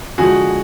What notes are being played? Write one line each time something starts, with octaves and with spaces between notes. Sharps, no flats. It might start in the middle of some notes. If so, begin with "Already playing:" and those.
D3 F3 G#3 F#4 G#4